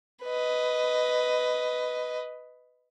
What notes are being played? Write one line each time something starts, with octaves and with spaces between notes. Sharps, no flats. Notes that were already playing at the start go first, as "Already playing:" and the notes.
B4 D#5